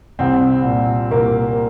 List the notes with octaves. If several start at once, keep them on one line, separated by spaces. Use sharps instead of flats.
C2 C4
A#2
C2 A#3